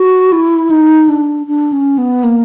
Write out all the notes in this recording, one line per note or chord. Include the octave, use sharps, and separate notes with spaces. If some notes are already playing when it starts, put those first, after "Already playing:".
Already playing: F#4
E4
D#4
D4
D4
C#4
B3
A#3